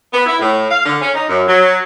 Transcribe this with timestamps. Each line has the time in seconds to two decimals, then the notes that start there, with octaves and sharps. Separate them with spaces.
0.14 B3
0.26 E4
0.40 A2
0.70 F5
0.86 D3
1.02 C#4
1.15 D#4
1.28 F#2
1.47 F#3